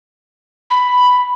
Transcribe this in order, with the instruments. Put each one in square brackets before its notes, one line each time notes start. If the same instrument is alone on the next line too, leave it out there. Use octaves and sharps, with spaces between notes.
[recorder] B5